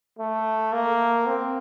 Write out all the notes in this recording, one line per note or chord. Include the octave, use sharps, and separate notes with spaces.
A3
A#3
C4